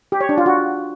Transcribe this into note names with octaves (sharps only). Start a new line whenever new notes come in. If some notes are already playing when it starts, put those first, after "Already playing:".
G4
C#5
D4
F4
F#4